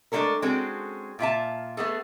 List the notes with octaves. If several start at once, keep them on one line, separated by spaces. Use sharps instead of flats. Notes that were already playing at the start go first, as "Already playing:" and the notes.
G#3 A3 C#4 D4 A4 A#4
G#3 C4 C#4 F#4 G#4 A4
A#2 F4 E5 A5
A3 B3 G#4 A4